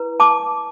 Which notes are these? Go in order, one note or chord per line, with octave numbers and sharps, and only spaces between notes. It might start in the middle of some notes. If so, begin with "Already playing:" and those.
Already playing: E4 B4
A5 D6